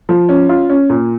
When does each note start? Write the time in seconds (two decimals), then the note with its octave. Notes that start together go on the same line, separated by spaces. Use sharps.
0.09 F3
0.29 C#4
0.49 F4
0.69 C#4
0.89 A#2